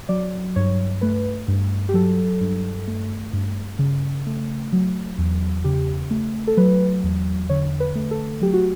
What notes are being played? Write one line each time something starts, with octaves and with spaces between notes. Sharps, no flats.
F#3 D5
G2 C#5
A3 B4
G2
G4
F#3 A4
G2
A3
G2
C#3
A3
F#3
E2
C#3 G4
A3
A4
F#3 B4
E2
D3 C#5
B4
A3
A4
F#3 G4
F#4